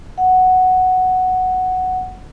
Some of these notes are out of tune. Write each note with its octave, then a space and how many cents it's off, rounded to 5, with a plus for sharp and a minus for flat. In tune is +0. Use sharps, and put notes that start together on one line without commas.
F#5 +0